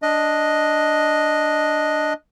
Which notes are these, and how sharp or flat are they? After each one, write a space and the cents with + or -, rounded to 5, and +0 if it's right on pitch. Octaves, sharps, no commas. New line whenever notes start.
D4 +0 D#5 +0